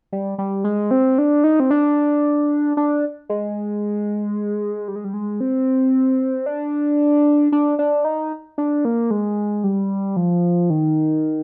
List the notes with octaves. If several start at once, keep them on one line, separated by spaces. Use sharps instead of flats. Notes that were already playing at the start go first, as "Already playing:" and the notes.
G3
G3
G#3
C4
D4
D#4
C4
D4
D4
G#3
G3
G#3
G3
G#3
C4
D4
D4
D4
D#4
D4
A#3
G#3
G3
F3
D#3